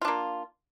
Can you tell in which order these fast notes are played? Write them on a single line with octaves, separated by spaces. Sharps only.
F4 D4 A#3